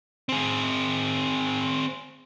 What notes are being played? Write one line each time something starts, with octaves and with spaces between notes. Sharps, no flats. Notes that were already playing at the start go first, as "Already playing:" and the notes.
C4 G#4